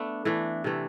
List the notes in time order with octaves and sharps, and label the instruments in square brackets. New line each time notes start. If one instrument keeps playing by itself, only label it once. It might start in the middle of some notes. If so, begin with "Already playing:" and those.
Already playing: [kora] A3 B3 D4
E3 A3 D4
C3 E3 A3